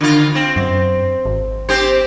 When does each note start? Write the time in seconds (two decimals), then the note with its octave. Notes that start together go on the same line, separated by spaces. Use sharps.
0.01 D3 F4
0.35 C4
0.56 F#2
1.26 G#1
1.69 C4 G4 C5